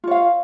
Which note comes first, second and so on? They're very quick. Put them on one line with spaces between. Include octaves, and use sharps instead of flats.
F4 C#5 F5